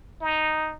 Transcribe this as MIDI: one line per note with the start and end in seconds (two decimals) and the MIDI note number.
0.21 0.74 63